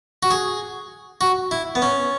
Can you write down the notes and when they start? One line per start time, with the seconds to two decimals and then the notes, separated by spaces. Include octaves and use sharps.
0.23 F#4
0.31 G#4
1.21 F#4
1.51 E4
1.75 B3
1.82 C#4